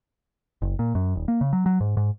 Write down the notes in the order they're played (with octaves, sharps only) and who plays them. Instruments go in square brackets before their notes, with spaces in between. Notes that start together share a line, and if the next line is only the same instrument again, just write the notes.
[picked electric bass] F#1
A#2
F#2
D#1
A#3
C#3
F#3
F#3
G#2
G#2